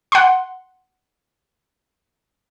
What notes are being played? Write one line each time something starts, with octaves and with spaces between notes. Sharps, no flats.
F#5 C6